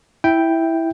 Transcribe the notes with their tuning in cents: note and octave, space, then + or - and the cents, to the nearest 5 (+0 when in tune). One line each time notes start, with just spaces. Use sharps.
E4 -5 E5 +0 G5 +0